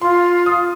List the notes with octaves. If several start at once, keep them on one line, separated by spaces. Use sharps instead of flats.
F4 C6
D#6